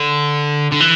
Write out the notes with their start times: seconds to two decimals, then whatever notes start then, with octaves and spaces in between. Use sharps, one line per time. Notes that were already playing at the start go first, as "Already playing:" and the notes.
Already playing: D3
0.72 D3
0.80 E3